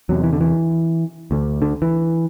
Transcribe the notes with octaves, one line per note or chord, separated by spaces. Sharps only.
E2 C3 F#3
E3
D3
E3
D2 D3
D3
E3